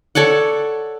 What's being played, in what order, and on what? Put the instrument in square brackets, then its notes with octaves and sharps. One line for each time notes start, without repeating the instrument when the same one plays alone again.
[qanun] A4 C#5 D5 F#5